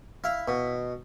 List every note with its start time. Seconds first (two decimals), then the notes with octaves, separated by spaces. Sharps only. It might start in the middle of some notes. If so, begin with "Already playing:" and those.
0.24 E4 F5
0.48 B2